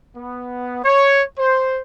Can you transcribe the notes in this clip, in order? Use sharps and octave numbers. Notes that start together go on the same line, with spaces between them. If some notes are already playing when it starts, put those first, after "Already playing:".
B3
C#5
C5